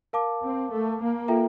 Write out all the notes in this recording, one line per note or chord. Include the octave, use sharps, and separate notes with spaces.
A#4 F5 A5 D6
C4
A3
A#3
F4 A4 E5 G5 A#5